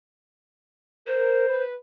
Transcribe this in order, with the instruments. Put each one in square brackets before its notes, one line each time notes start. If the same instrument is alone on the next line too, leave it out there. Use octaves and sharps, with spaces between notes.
[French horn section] A#4 [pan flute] C5
[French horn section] B4